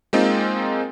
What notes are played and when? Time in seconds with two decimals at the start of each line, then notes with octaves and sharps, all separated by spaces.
0.13 G#3 A#3 C4 D#4 F4